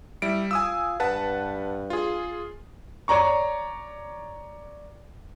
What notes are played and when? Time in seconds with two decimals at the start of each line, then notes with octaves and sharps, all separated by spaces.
0.22 G3 E4 D7
0.51 F4 G#5 D#6 E6
1.00 G2 B4 F#5 A5
1.90 F4 G#4
3.08 C#5 D5 A#5 C#6